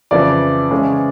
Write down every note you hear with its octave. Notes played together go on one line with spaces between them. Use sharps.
F2 C#3 E3 D5
C#3 E3 G#3 C#4